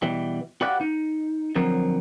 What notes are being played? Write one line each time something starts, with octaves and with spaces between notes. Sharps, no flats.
B2 E3 G3
F#4 G4 B4 D5 F5 F#5
D#4
D3 F3 F#3 C4 A#4